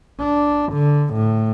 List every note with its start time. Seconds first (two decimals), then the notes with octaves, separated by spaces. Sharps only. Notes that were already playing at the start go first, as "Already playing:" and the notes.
0.20 D4
0.73 D3
1.14 A2